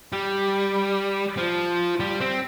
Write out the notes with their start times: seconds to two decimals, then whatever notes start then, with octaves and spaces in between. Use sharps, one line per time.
0.13 G3
1.37 F3
2.00 G3
2.21 C4